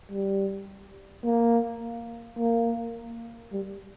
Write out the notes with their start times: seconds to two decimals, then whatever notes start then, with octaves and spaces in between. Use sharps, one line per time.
0.12 G3
1.25 A#3
2.38 A#3
3.52 G3